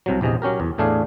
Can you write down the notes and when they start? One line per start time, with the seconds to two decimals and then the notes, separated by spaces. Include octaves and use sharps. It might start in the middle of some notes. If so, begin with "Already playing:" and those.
0.06 C2 C3 F#3
0.21 A#1 E2 C3 G#4 D#5
0.42 F#3 C#4 G4 A#4
0.60 E2
0.78 E2 A2 A3 D4 G#4 F5